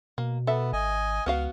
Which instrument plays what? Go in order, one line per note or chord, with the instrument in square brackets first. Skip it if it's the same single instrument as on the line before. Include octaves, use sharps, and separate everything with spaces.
[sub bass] B2 [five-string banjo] A#3
[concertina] B3 [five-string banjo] A4 E5
[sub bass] G#1 [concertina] D#5 G#5
[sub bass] C#2 [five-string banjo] B3 F#4 F5 [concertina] F6